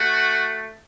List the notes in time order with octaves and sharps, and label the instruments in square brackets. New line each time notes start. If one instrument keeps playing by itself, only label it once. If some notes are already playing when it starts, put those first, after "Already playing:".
Already playing: [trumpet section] A3 F#4